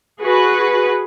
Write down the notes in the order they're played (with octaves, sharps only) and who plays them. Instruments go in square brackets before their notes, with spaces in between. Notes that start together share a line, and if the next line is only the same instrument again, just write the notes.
[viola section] F#4 G#4 B4